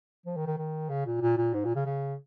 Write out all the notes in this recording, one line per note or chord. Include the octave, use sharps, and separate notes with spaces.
F3
D#3
D#3
D#3
C#3
A#2
A#2
A#2
G#2
A#2
C#3
C#3